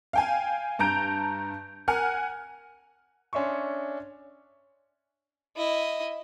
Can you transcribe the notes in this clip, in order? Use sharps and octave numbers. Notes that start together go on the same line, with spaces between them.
F5 G5 G#5
G2 A5 A#5 G6 D7
A#4 F#5 G#5 F6
C#4 D4 E5 C6 C#6
E4 D#5